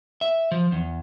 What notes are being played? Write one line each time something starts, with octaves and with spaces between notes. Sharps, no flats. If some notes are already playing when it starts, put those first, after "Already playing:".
E5
F3
E2